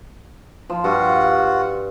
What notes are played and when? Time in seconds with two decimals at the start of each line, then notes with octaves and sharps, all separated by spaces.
0.70 F3
0.84 G2 F4 F#4 F#5